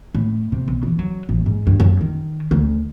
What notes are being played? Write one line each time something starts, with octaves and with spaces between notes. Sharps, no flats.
A2
C3
B1
E3
F#3
A1
G#2
G2
F#2
D#3
D2